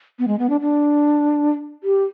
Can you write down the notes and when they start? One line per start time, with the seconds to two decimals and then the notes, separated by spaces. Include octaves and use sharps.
0.19 B3
0.28 G#3
0.39 B3
0.50 D4
0.61 D4
1.84 G4